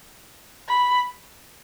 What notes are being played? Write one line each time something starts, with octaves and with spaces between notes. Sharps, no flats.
B5